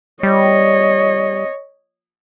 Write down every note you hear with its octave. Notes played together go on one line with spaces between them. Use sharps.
G3 C#5 D#5